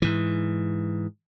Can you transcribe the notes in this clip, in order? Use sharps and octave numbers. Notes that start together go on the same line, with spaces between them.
G#2 E3